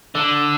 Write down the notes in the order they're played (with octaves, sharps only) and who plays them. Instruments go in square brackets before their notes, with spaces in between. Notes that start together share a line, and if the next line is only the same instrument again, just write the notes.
[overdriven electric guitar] D3